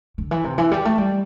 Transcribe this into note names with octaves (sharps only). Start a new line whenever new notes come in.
D3
E3
C3
E3
G3
A3
G3